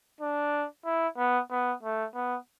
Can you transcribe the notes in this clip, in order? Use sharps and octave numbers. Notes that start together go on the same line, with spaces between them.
D4
E4
B3
B3
A3
B3